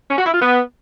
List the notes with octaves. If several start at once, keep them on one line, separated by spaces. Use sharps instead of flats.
C#4
F#4
E4
F4
B3